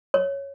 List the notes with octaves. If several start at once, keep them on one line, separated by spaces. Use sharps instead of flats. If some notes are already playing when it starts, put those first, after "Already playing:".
C#5